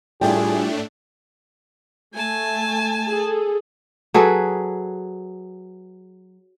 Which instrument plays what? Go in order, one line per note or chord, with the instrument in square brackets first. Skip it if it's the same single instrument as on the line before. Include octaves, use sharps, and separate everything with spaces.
[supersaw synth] A2 A3 D4 [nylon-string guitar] G3 E4 F4 [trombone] G#4 [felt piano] G5
[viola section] A3 [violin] G#5 A5
[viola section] G#4 A4
[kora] F#3 G#4 A4 B4